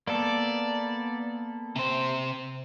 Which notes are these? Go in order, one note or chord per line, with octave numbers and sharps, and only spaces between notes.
A#3 B3 A4 D5
C3 C5